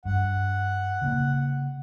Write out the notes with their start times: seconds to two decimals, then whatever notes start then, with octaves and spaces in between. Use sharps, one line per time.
0.05 G2 F#5
1.02 C#3 A#3